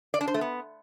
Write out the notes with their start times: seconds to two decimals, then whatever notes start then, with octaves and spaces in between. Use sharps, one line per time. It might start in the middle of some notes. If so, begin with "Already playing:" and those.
0.14 D5
0.21 D4
0.27 C5
0.34 A3
0.41 B3